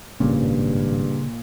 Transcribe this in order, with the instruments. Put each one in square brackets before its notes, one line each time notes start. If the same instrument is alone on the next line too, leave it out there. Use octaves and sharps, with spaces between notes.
[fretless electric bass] G#1 G3 C#4 [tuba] G2 [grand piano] A#2 [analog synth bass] C#3